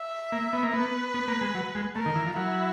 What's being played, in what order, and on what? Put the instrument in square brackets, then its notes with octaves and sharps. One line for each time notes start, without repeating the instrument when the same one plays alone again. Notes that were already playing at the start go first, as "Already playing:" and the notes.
Already playing: [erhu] E5
[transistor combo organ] A#3
B3
A#3
[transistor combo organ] B3 [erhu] B4
[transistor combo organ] B3
A#3
G#3
F#3
G#3
[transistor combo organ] A3 [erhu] A#4
[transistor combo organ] D#3
E3
F3
[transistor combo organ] F#3 [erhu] E4